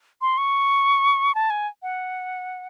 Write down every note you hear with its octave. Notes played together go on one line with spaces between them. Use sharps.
C6
C#6
A5
G#5
F#5